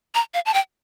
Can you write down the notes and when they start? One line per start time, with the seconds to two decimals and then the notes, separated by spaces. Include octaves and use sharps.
0.15 A#5
0.34 F5
0.46 A5
0.54 G5